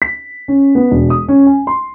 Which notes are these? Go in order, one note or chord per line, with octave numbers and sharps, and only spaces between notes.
B6
C#4
B3
E1
D#6
C#4
G#5
C6